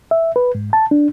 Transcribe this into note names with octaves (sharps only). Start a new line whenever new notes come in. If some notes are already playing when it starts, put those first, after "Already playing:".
E5
B4
G#2
A5
D4